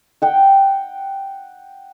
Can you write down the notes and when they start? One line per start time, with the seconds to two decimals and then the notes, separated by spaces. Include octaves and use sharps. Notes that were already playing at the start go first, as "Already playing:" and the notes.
0.22 F#5 G5